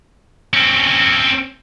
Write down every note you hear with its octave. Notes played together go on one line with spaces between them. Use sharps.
C4 C#4